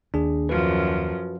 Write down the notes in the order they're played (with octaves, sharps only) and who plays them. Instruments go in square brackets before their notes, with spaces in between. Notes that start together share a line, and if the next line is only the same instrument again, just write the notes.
[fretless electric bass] D#2 [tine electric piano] D4 G#4
[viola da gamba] F#2 F3 [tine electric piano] F#4 B4